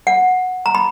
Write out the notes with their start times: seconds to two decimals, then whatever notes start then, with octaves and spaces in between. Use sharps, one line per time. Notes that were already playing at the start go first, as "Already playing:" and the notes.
0.07 F#5
0.66 A#5
0.75 B5